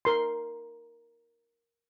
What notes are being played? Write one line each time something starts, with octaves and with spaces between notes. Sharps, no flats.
A#4 C6